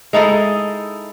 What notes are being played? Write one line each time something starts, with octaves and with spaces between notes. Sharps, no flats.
G#3 D#4 E4 A4